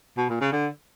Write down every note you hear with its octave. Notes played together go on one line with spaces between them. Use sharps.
B2
A#2
C#3
D3